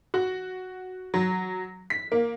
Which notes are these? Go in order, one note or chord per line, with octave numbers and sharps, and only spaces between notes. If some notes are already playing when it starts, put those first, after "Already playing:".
F#4
F#3
B6
A#3